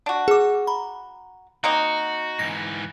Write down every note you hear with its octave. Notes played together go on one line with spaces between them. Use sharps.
D4 F#4
G#4 D6
A#5 B5
A#3 C4 D#4 F#4
G#2 E3 A#6